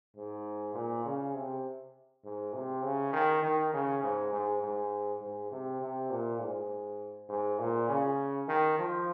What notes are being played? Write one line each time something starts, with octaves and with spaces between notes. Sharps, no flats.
G#2
A#2
C#3
C3
G#2
C3
C#3
D#3
D#3
C#3
G#2
G#2
G#2
G#2
C3
C3
A#2
G#2
G#2
A#2
C#3
D#3
F3